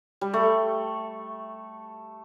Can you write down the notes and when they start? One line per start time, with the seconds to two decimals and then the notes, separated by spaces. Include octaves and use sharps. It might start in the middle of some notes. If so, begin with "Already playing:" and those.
0.21 G3
0.34 A3